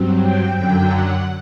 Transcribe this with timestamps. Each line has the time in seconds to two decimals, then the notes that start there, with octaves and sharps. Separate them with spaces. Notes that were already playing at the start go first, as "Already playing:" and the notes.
Already playing: G2 F#3 C4
0.22 G5
0.55 F#2 D3 F#3 G5
0.89 F#5